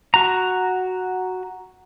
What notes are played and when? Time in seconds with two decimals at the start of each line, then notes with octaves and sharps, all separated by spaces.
0.14 F#4 A#5